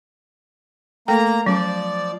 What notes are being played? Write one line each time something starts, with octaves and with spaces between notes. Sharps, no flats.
A3 A#3 A4 G5 A#5
F3 F#3 C#4 D5